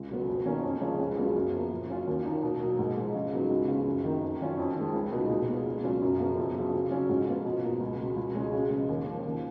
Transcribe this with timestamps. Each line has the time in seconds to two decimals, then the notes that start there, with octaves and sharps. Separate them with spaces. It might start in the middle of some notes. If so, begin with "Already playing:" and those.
Already playing: C#2
0.10 B2 F#3 B3
0.28 F2
0.46 D#3 A#3 C#4
0.63 F2
0.81 C#3 F3 G#3 C#4
0.99 C#2
1.17 C#3 F#3 B3
1.35 F#2
1.53 F3 A#3
1.71 A#2
1.89 F#3 C#4 F4
2.07 D#2
2.25 D#3 A#3 D#4
2.42 B2
2.60 F#3 A#3
2.79 G#2
2.97 F3 G#3
3.14 C#3
3.33 F#3 B3 D#4
3.51 C#2
3.68 C#3 F3
3.87 F#2
4.04 D#3 A#3 D#4
4.22 F2
4.41 D#3 F#3 C#4 F4
4.57 F2
4.76 D#3 G#3
4.94 C#2
5.12 B2 G#3 B3 D#4
5.29 A#2
5.48 G#3 B3 F4
5.65 C#2
5.83 B2 F#3 C#4 F4
6.02 F#2
6.19 C#3 F3 B3
6.37 F2
6.55 C#3 F#3
6.74 C#3
6.91 F#3 C#4 F4
7.09 G#2
7.27 F3 B3 F4
7.44 B2
7.62 A#3 F4
7.80 C#2
7.99 B2 G#3
8.16 C#2
8.35 B2 G#3 C#4
8.53 C#3
8.70 F3 G#3
8.89 D#2
9.06 C#3 F3
9.25 D#2